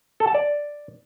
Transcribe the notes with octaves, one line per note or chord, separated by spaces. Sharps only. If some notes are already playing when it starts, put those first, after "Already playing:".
A4
A5
D5